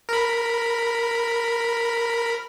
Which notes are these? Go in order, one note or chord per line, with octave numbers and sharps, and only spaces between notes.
A#4 B5